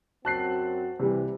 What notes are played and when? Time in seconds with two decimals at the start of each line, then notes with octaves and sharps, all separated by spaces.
0.25 F#2 C4 F#4 A5 F#6 C7
1.00 C3 E3 G3